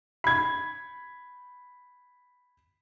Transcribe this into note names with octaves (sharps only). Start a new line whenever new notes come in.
B5 G#6